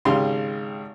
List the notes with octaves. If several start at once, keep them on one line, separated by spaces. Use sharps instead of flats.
G#1 C#3 G4 F5 C6